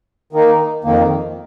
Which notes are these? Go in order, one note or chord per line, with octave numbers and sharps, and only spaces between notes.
D#3 A#3 D#4
F2 D#3 A#3